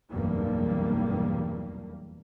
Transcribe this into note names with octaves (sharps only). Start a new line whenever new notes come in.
F1 B1 E2 G2 G3 A#3